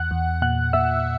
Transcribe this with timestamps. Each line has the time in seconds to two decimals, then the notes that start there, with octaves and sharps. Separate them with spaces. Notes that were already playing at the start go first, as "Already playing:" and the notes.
Already playing: E2 F#5 F#6
0.11 E2
0.42 A#2 F#5 F#6
0.73 A#2 E5 E6